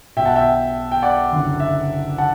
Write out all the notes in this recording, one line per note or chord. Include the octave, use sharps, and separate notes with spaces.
B1 B2 E5 G5
F#5 A5
E5 G5
G5
D5 F#5
F#1 F#2 D3
E5
F#5 A5